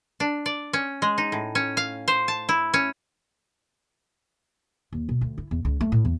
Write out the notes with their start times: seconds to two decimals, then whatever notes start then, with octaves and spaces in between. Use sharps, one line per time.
0.20 D4
0.46 D5
0.73 C#4
1.02 G#3
1.18 D#4
1.32 A2
1.55 C#4
1.77 F5
2.08 C5
2.28 A5
2.49 E4
2.74 C#4
4.93 D#2
5.09 B2
5.21 D2
5.38 E4
5.51 E2
5.65 C#2
5.81 A3
5.92 A2
6.05 E2